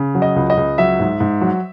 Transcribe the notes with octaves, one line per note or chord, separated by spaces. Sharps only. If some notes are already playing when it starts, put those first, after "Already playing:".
Already playing: C#3
F#3
D#5
C#2
D#5
C#2
F#3 E5
G#2
G#2
F#3